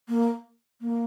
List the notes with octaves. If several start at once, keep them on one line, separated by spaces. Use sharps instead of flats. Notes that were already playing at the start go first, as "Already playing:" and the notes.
A#3
A#3